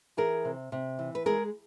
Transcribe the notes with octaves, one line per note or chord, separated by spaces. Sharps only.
E3 G#4 A#4
C3
C3
E3
B4
G#3 G#4 A#4